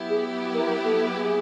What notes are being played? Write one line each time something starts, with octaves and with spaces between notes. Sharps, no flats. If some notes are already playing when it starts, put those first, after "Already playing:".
Already playing: F#3 B3 E4 G4
G#4
A#4
A4
G#4